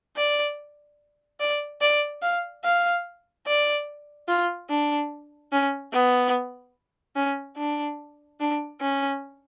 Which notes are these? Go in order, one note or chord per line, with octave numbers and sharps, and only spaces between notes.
D5
D5
D5
F5
F5
D5
F4
D4
C#4
B3
C#4
D4
D4
C#4